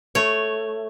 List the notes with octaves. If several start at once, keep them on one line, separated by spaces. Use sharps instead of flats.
A3 C#5